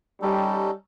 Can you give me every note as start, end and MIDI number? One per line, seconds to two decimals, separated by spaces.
0.22 0.71 55
0.22 0.71 61
0.22 0.71 63
0.22 0.71 69